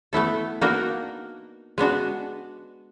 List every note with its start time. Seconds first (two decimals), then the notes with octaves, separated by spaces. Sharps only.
0.13 A3 B3 E4 A4
0.61 A#3 B3 D4 D#4 F#4 A#4
1.78 G#3 B3 D4 F#4